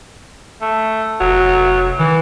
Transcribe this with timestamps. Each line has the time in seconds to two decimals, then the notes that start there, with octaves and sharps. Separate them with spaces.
0.62 A3
1.20 F1 F#3
1.99 D#3 E3